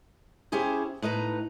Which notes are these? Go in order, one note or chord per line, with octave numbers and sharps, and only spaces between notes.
C#4 E4 G4 G#4 C5
A2 D#4 B4 A#5